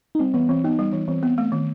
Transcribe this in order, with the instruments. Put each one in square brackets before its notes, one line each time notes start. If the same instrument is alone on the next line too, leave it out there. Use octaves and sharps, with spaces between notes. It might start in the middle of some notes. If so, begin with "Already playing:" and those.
[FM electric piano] D#4
[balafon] G3 [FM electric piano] C4
[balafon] E3 [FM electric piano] B3
[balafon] E3 [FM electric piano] C4
[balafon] B3 [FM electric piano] D#4
[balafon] G3
E3
[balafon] E3 [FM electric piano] C4
[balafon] B3
A3
D#3